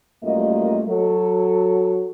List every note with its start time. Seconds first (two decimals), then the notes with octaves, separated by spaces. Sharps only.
0.24 F#2 G3 A3 A#3 F4 D#5
0.88 F#3 A4